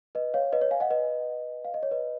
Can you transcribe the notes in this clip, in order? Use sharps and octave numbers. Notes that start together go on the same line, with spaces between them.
B4 D#5
C#5 F5
B4 D#5
C#5
F5 G#5
D#5 F#5
B4 D#5
F5
D#5
C#5
B4 D#5